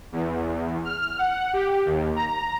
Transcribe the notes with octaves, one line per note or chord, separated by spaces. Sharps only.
E2
F6
F#5
G4
D#2
A#5